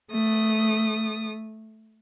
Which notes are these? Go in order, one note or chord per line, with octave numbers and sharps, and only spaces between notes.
A3 D#6